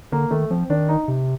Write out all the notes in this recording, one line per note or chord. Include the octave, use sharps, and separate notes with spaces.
D3 A#3
D#3 A3
F3 C4
D#3 D4
D#4
C3